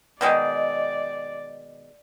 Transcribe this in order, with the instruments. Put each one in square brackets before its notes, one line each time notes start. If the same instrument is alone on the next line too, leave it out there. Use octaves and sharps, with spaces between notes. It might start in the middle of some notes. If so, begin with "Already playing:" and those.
[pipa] B2 D#3 G#3 [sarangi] D5